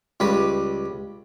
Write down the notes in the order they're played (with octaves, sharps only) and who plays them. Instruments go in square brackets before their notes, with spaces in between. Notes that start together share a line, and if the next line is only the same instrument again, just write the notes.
[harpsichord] C#2 G3 B4 D#6